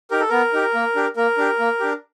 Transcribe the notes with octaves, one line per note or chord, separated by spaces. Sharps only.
D#4 G4 A#4
A4
B3 A#4
D#4 G4
A#3
D4 G4
A#3 A#4
D4 G4
A#3
D4 G4